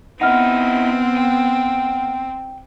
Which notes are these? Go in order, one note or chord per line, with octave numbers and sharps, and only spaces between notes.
B3 C4 D#4 E4 F#5 F6
G5